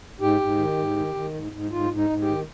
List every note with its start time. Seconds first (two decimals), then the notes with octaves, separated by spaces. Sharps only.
0.20 G#2 G4
0.40 G#2
0.58 D#3
0.78 G#2
0.97 D#3
1.14 D#3
1.34 G#2
1.52 G#2
1.71 G#2 F4
1.90 G#2
1.97 D#4
2.10 G#2
2.22 G4
2.28 D#3